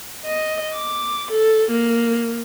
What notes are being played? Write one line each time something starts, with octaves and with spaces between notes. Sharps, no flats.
D#5
D6
A4
A#3